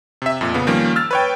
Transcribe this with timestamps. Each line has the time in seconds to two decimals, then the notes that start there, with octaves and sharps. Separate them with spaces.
0.22 C3 E5
0.41 F2 A#2
0.54 C#3 B3
0.67 D#3 F3 G3 A#3 C#4
0.96 E6 F6 A6
1.11 B4 C#5 G5